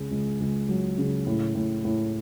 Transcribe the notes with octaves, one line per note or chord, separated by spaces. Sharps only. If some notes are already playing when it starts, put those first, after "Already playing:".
Already playing: C#2 C#3 G#4
C#2
C#2
F#3
C#3
A2
A2
A2